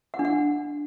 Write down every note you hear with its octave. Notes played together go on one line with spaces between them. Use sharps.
F#5
D4
F#5